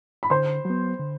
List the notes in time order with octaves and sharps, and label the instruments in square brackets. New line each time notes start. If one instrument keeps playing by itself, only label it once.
[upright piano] B5
[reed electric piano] D3 [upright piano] C5 C6
[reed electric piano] F#3 B3
D3